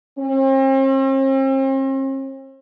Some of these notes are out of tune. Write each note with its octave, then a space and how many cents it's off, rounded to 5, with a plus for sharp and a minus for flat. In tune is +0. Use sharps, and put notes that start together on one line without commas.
C4 +45